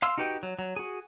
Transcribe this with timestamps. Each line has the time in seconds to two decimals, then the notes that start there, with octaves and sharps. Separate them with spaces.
0.02 F5 C6 E6 F6
0.18 D#4 F#4 G4 B4 G5
0.43 F#3
0.59 F#3
0.76 F#4 G#4